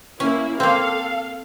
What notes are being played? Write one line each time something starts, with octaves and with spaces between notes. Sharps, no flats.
A#3 C#4 E4
A#3 C4 A4 F5